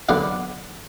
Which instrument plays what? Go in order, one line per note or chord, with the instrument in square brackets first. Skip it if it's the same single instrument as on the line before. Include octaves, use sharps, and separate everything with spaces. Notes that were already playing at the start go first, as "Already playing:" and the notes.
[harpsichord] D3 F#3 B3 D5 F5